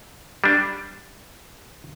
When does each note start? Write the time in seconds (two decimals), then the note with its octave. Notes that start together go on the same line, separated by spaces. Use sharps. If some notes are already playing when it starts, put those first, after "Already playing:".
0.44 G3 D4